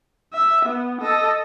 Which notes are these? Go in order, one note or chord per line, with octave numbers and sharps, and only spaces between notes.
E5
B3
A4 D#5